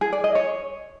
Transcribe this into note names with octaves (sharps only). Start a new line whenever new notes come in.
G#4
D5
D#5
C#5